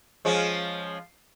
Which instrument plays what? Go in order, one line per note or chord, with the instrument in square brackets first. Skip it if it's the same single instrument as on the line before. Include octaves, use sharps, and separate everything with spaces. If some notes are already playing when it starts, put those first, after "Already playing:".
[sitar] F3 G#3 C#4